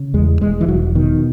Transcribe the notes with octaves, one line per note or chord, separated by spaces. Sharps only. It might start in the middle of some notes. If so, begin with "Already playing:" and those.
Already playing: C#3
E2 G#3
E1 G#3
E3
E1 F#3
B2 D#3